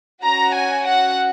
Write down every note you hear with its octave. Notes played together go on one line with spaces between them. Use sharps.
C#4 F#4 A#5
G#5
F#5